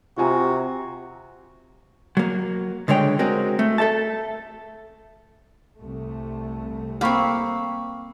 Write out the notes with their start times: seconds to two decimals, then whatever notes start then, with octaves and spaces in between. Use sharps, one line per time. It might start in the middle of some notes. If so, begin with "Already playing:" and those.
0.18 C3 F4 F#4 G#5 A#5
2.17 F#3 A#3
2.88 C#2 D3 G#3 C#5 G5
3.19 G#3 C4 C#4 F#4 A#4
3.59 A3
3.78 A4 E5 A5
5.79 C2 C3 A3
7.01 A#3 C4 F5 B5 C#6